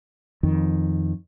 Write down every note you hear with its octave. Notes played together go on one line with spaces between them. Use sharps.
F2 D#3